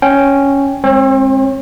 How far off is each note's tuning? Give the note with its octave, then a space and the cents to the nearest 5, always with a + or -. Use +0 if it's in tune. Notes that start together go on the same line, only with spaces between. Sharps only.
C#4 +0 G5 +0
G#3 +0 C4 +35 C#5 -30